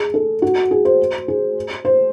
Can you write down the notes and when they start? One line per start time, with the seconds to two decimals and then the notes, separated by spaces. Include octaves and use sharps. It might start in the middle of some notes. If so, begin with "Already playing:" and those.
Already playing: G#4
0.14 A4
0.42 F#4
0.71 G#4
0.85 C5
1.28 G#4
1.85 C5